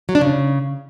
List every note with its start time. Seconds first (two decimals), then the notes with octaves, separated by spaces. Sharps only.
0.09 F#3
0.15 D4
0.21 C#3